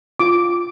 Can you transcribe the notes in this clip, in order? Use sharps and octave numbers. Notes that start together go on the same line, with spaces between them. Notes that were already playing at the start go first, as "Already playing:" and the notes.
F4 D6